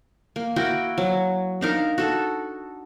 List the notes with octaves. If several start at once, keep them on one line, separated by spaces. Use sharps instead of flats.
A#3
E4 F#4 A#4 G5
F#3
D4 D#4 A#4 F5
F#4 A4